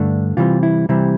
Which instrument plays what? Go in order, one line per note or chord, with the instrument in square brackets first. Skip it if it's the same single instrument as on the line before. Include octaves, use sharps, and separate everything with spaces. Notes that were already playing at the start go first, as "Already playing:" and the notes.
Already playing: [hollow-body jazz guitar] G2 D3 A3 D4
C3 E3 G3 C4 F4
E4
C3 E3 G3 C4 E4